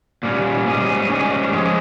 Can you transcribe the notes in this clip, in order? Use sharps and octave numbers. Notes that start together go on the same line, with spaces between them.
A#2 G3 C#4
G#2 G3 C#4 G#4
G#2 G3 C#4 G#4
F3 G#3 C#4 G#4